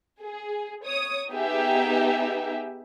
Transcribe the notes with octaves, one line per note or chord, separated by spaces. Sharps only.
G#4
C#5 D#6
B3 D#4 G4 G#4 E5